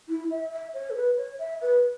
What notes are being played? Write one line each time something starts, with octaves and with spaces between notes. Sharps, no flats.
E4
E5
E5
C#5
A4
B4
C#5
E5
B4